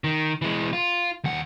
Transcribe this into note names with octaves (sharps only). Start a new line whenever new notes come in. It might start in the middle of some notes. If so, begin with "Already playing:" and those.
D#3
E3 G#3
F4
D#2 F#5